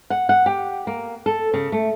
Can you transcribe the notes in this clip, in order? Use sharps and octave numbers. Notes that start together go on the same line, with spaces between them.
F#5
F#5
G4
A#3
A4
C#3
A3